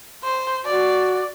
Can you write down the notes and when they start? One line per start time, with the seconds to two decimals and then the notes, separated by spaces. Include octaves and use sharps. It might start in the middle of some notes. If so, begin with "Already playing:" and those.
0.24 C5
0.66 F#4 D5